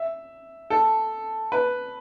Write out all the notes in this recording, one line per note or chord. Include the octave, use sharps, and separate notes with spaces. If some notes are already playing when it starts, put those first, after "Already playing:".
Already playing: E5
A4
B4